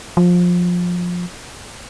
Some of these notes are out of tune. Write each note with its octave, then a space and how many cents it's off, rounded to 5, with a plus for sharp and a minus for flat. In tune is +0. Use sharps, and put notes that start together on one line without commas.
F3 +20